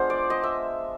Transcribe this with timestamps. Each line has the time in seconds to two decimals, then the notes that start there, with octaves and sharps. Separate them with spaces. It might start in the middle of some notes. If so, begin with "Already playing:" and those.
Already playing: G#3 B3 D4 F4 C5
0.10 D5
0.30 D#5
0.43 E5